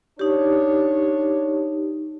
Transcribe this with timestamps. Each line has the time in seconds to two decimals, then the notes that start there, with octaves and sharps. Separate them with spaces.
0.19 D4 D#4 G4 C#5